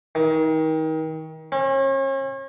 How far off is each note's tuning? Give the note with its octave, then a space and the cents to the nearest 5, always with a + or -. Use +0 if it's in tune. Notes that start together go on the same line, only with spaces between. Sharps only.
D#3 +30
C#4 -40